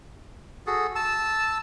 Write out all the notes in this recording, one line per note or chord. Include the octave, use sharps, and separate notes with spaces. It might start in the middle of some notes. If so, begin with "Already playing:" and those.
F#4 G#4 A4
A5 E6